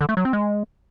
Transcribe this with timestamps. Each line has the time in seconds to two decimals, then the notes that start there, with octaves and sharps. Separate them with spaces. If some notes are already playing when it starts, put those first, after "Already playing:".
0.01 D3
0.09 A3
0.17 F#3
0.25 C4
0.33 G#3